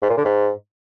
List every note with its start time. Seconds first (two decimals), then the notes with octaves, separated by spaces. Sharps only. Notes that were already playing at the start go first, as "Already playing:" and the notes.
0.02 G#2
0.10 A#2
0.17 D3
0.25 G#2